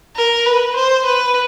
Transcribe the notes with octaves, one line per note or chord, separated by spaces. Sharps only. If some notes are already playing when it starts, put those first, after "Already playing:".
A#4
B4
C5
B4